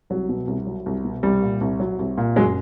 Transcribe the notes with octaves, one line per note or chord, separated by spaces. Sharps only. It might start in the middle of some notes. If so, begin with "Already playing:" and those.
C2 F#3
B2
C2
F#3
C2
B2
C2 G3
A#2
C2
F#3
C2
A#2
F#1 F#3 G#3